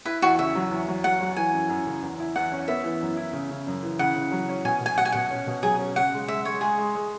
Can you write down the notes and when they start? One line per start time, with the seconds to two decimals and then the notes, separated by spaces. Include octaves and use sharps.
0.05 E4 B4
0.22 E2 F#4
0.38 C#3 E5
0.55 F#3
0.71 E2
0.88 F#3
1.04 F#3 F#5
1.20 F#3
1.36 E3 G#5
1.53 F#2
1.69 F#2
1.87 C#3
2.02 E2
2.19 E4
2.36 E2 F#5
2.52 C#4
2.68 B3 E5
2.84 E3
3.01 F#2
3.17 E4
3.33 C#3
3.50 C#3
3.67 F#2
3.83 E3
3.99 C#3 F#5
4.15 C#3
4.32 F#3
4.49 C#4
4.64 B2 G#5
4.81 B2 G#5
4.98 B2 F#5
5.05 G#5
5.12 B2 F#5
5.31 C#4
5.47 B2
5.63 F#3 G#4
5.79 C#4
5.96 C#3 F#5
6.13 G#3
6.28 G#3 E5
6.45 G#3 C#5
6.61 G#3 G#4
6.78 G#3
6.95 G#3